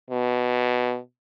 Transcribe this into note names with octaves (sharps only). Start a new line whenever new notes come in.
B2